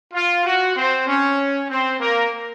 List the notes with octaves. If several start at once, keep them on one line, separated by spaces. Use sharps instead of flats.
F4
F#4
C4 C5
C#4 C#5
C4 C5
A#3 A#4